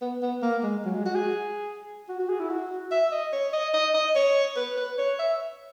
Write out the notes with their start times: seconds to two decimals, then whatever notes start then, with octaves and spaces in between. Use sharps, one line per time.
0.01 B3
0.22 B3
0.42 A#3
0.63 G#3
0.85 F#3
0.95 G#3
1.06 F#4
1.15 G#4
2.09 F#4
2.19 F#4
2.29 G#4
2.39 E4
2.49 F#4
2.92 E5
3.12 D#5
3.33 C#5
3.54 D#5
3.74 D#5
3.94 D#5
4.15 C#5
4.57 B4
4.77 B4
4.98 C#5
5.19 E5